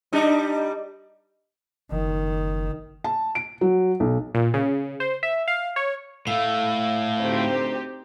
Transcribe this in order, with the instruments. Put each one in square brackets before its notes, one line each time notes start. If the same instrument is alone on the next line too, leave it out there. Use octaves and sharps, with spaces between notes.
[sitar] G3 D4 D#4
[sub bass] F#1 [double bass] D#3
[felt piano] A5
D7
F#3
B1
[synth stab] A#2
C#3
C5
E5
F5
C#5
[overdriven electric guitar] A2 A3 [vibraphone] F5 E6
[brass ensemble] D2 C5 [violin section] C4 D#4 G4